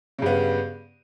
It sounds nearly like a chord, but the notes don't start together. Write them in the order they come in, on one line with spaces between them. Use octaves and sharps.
C#3 G2 B3